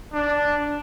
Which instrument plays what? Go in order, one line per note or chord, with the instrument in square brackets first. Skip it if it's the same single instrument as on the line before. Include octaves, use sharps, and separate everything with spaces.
[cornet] D4